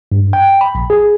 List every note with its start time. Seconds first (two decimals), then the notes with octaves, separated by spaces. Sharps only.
0.12 G2
0.33 G5
0.61 B5
0.75 A#1
0.90 G#4